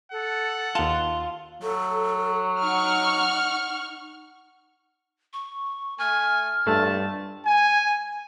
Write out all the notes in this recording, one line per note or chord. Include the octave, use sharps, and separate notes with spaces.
A4 F#5
D#2 F4 A5
F#3 A4
D#4 F#5 C#6 F6
C#6
A3 G#5 F6
G2 A3 F4 A5
G#5